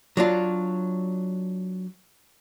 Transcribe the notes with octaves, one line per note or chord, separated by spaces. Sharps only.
F#3 D4 F4